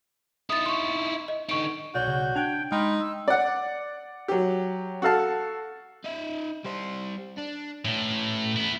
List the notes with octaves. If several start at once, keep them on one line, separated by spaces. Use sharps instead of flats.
D#4 E4 D#6 A6
C6 C#6
D#5
D3 D#4 C#6 D7
B1 F#4 C#5 D5 G6
C#3
D4 G5 F#6 G#6 F7
G#3 D#4 G5 B5 C6 F6
E6
D5 F#5
F#3 G4
F#4 A4 F5 A5
D#4 E5
G3 C5
D4
A2 A3 C#4
B3 E4